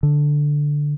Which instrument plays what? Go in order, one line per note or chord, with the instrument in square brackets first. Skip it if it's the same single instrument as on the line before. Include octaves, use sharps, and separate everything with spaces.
[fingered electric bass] D3